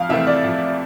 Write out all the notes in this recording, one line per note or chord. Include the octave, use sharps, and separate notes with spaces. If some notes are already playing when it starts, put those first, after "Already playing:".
Already playing: F2 F5
C3 E3 A3 C4 E5
D5
F2